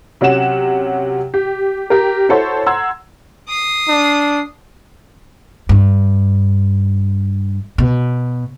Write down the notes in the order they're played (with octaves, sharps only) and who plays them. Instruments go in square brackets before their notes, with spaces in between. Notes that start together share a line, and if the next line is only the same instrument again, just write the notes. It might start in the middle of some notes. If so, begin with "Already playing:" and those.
[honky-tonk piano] C3 F#3 C#4 F#5 E7
G4
G4 A#4
E4 F#4 A4 C5 C#5
F#5 A#5 C6 E6 G#6
[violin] D#6 C7
[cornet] D4
[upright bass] G2
B2